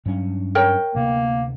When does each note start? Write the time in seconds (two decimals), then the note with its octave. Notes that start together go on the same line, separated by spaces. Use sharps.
0.06 G2 F#3 C#4
0.55 A#4 C#5 G5
0.95 D2 C3 A#3 B3